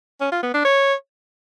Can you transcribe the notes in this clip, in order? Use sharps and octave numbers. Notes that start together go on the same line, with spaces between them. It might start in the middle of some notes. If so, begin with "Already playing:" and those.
C#4
F4
B3
D4
C#5